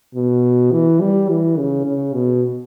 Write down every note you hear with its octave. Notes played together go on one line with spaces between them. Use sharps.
B2
E3
G3
E3
C#3
C#3
B2